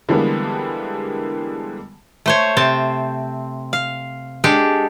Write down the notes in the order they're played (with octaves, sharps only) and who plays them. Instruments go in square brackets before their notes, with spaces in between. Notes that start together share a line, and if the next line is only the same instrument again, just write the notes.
[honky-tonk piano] D3 E3 G3 G#3 A#3 B3
[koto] A3 C5 C#5
C3 C4 A5
F5
G#3 D4 G4 A4